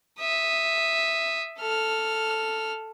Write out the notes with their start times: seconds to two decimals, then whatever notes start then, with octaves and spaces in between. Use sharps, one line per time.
0.19 E5 D#6
1.58 A4 F6